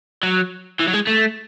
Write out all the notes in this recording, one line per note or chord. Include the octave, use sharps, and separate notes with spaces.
F#3
E3
F#3
G#3
A3